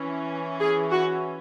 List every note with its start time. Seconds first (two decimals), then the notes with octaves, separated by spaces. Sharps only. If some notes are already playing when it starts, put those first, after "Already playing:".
Already playing: E3 C#4
0.60 G#4
0.90 F#4